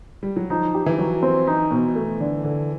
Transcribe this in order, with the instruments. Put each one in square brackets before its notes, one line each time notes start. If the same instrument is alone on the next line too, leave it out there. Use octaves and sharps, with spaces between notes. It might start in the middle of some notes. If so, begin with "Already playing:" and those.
[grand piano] G3
F#3
[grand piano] F3 [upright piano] D#4
[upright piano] G4
[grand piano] E3
[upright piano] F#3
C4
D#4
B2
A3
D3
D3